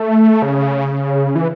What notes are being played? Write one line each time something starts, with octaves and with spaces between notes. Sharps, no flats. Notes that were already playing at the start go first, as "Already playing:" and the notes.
Already playing: A3
C#3
E3